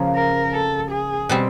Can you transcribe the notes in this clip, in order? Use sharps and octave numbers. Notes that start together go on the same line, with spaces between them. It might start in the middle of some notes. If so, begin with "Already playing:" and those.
Already playing: C#3 F3 A#3
A#4
A4
G#4
B2 G3 C4